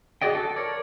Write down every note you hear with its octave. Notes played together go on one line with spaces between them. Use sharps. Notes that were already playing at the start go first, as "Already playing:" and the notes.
F#4 G#4 D5 D#5 G5
A4
A#4 C#5 D5